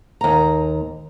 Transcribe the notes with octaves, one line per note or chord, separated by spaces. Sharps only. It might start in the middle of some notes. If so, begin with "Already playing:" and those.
D#2 A#5